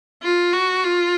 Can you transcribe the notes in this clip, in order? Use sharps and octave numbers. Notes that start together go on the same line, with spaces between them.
F4
F#4
F4